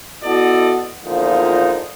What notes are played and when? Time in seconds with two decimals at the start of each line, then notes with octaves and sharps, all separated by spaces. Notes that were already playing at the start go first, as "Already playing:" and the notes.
0.23 B3 E4 F#4 A4 D5 D#5
1.05 E2 A#2 D3 F3 G#3 D#4